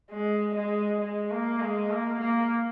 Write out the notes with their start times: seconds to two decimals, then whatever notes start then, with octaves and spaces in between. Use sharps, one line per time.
0.11 G#3
0.56 G#3
1.01 G#3
1.31 A#3
1.61 G#3
1.90 A#3
2.20 A#3